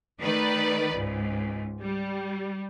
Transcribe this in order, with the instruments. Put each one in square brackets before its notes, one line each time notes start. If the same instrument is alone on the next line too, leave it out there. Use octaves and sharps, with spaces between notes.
[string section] D#3 A3 D#4 B4 D5
C#2 G#2
G3